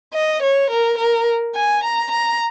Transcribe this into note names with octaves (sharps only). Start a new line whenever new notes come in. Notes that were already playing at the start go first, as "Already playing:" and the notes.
D#5
C#5
A#4
A#4
G#5
A#5
A#5